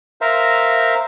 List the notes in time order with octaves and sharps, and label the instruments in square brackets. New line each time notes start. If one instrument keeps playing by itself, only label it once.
[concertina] A#4 C5 E5 F5 A#5